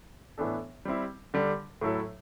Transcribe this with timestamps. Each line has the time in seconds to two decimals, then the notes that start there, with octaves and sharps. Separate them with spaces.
0.38 A2 E3 B3 D4 A4
0.85 G3 C4 E4
1.34 D3 G3 D4
1.81 A2 F#3 A3 E4 A4